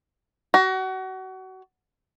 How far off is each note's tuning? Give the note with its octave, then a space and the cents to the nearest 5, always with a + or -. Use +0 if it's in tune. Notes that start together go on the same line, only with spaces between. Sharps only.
F#4 +30